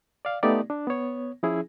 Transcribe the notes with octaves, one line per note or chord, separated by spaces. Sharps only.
D5 F5
A3 B3 D#4 G4 D5
D4
B3 C#5
F3 C#4 E4 G#4